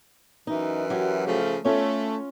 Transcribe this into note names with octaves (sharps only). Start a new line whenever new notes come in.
F#2 E3 D#4
F#3 G4
C#3 F3 A3
A3 C#4 F4 C#5